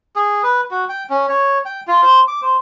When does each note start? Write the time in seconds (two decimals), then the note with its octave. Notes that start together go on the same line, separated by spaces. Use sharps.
0.16 G#4
0.43 B4
0.71 F#4
0.89 G5
1.10 C#4
1.29 C#5
1.65 G5
1.88 F4
2.02 C5
2.28 D6
2.42 C5